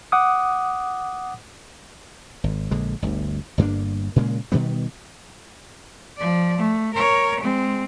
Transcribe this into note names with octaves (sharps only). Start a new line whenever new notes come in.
F#5 D6 D#6
G#1
A#1 D3 G#3
G1 D2
G1 G2 A#3 D4
A#2 C#3 G#3 A#3
B2 D#3 G3 B3
F3 D5
A3
A#4 C#5
G#3 C4